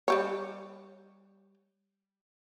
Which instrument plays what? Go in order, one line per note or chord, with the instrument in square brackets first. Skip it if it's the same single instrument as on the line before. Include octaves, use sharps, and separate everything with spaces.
[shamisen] G3 G4 C#5